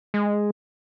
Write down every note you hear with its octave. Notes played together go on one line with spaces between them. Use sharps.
G#3